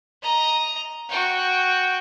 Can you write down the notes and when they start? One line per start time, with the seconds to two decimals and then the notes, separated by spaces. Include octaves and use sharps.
0.22 D#5 A#5
1.09 F#4 G5